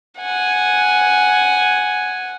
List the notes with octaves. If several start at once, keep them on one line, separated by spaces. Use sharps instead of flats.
F#5 G#5